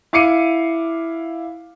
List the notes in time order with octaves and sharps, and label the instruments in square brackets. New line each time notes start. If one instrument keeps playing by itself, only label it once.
[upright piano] E4 F5 D6 C7 C#7 D#7